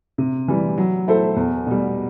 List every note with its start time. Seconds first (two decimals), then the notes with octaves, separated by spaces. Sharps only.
0.18 C3
0.48 E3 G3
0.78 F#3
1.08 A3 E4 A4 C5
1.36 E2
1.67 B2 G3